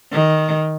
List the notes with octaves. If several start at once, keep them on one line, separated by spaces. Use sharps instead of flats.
D#3